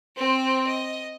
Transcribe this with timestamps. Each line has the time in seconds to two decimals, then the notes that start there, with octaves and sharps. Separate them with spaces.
0.17 C4 C5
0.67 D#5